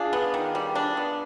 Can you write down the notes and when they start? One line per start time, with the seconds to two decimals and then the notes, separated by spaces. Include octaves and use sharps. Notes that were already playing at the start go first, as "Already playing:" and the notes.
Already playing: D4 F4 G#4
0.13 B3
0.34 D#3
0.55 G3
0.75 D4
0.97 B3